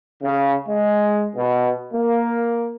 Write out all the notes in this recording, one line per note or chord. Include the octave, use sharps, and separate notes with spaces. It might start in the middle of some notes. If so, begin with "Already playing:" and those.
C#3
G#3
B2
A#3